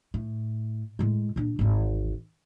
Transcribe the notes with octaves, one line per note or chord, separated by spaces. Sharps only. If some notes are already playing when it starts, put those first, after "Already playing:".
A2
A2 G#3
A#2 D4
G#1 E2